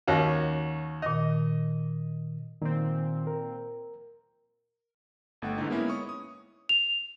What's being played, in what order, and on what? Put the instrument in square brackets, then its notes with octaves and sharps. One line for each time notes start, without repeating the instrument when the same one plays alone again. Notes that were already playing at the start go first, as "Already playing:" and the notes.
[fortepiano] D#2 C#4 F#4
[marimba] A#2 D#3 [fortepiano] D#5
[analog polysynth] A#2 C4 [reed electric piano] D#3
[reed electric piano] A#4
[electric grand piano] G1 A3 F#5 G5
G#2 D3 E3 D#4
G#3 A#3 B3 C#4 D#4 E4
C#5 C#6 D#6
D#6
[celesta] F7